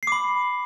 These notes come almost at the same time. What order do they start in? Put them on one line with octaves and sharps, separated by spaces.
C7 D6 B5